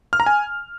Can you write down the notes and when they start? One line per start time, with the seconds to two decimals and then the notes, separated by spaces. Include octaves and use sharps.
0.13 F6
0.20 A#5
0.26 G#5